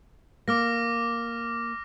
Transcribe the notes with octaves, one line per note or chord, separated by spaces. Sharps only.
A#3 D6 F6 A#6